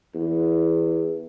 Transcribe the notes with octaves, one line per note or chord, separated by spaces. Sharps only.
E2